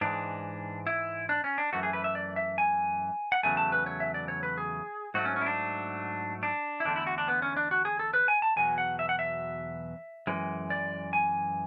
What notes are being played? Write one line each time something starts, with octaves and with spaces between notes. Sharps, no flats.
G#2 E3 G#3 D4
E4
D4
C#4
D4
F#2 E3 A3 F#4
G#4
B4
E5
D5
E5
G#5
F#5
E2 C#3 F#3 A3 G#5
A5
B4
C#5
E5
D5
C#5
B4
G#4
G#2 F#3 A3 F#4
C#4
C#4
E4
D4
D4
E4
E2 D3 A3 D4
E4
F#4
D4
B3
C#4
D4
F#4
G#4
A4
B4
G#5
A5
E2 B2 F#3 G#5
F#5
E5
F#5
E5
F#2 E3 G#3
D5
G#5